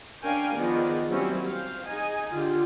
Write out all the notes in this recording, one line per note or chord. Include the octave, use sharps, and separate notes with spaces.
C#4 D4 A#4 F5 G5 G#5
D#3 F3 B3 G#4 D5 D#5
F#3 G3 A#3 C4 C#4 E4
C5 F5
D#4 G#4 D#5 G#5
D3 F4 G4